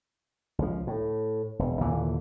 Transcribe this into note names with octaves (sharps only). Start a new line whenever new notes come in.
C#2 F3
A2
E1
D#2 A#2 D3 E3